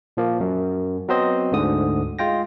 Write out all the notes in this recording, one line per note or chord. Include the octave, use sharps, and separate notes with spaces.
A#2 F3 A#3
F#2
F#3 B3 C4 C5 D#5
D2 G#2 D3 D#6
G#3 F4 G5 A#6